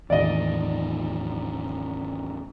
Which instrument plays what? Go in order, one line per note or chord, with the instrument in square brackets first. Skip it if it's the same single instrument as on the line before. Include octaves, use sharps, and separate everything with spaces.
[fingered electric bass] E2 A2 D#3 [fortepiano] D5 D#5